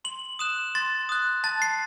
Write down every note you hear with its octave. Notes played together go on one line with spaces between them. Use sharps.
C6 F#7
D#6 F#6 E7
C6 A6
D#6 F#6
A5 A6
C7